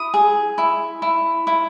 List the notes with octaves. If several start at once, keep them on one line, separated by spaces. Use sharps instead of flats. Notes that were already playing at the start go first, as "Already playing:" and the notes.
Already playing: E4 D#6
G#4
E4
E4
E4